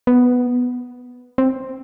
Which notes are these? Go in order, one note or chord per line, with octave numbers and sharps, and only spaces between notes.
B3
C4